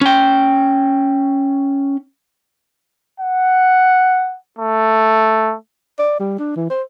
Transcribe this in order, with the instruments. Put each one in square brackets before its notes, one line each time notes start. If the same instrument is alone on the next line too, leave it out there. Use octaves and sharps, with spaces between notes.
[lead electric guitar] C#4 G5
[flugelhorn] F#5
A3
[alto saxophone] D5
G3
D4
E3
C5